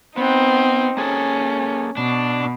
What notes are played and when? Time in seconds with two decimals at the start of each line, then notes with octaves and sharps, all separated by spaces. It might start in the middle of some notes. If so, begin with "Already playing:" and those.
0.17 B3 C4 D#4
0.97 A#3 C#4 G#4 A4
1.97 B2 D4